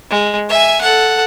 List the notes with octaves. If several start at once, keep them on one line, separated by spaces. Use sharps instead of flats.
G#3
E5 G#5
A4 F#5